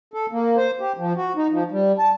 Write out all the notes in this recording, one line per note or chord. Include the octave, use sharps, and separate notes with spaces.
A4
A#3
C5
G4
F3
F#4
D#4
F3
G3
A5